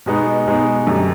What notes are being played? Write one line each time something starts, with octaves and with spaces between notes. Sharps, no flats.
B2 G#3 B3 D#4
B2 G#3 B3 D#4
F#2 D3 G3